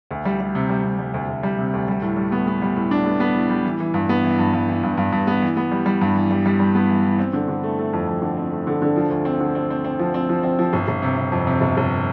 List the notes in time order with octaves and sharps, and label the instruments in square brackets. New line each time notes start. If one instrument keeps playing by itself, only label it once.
[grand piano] D2
G3
G3
C3
G3
C3
G3
D2
D2
G3
C3
D2
G3
A2
G3
B3
B3
G3
A2
D4
B3
B3
A2
G3
E3
E3
G2
B3
E3
G2
G2
E3
G2
G2
G2
B3
E3
B3
G3
G3
G2
E3
G3
G3
G3
B3
E3
E3
C4
D3
D3
A3
A3
F2
F2
D3
C4
A3
D3
D3
F3
D2
C4
D3
C4
C4
C4
F3
C4
F3
C4
F3
G1
G1
C3
C3
F2
C3
G1
G1